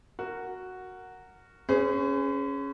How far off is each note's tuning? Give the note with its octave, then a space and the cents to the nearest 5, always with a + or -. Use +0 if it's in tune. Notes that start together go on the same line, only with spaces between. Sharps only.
F#4 +0 A#4 -15
C#4 +0 G#4 +0 B4 +45